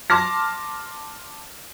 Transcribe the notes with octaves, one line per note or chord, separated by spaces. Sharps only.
A5 C6 D6 F6 A#6